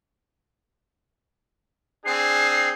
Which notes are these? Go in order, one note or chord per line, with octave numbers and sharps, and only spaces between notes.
C4 D4 G#4 C7